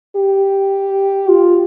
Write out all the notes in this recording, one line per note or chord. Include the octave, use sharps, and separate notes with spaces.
G4
F4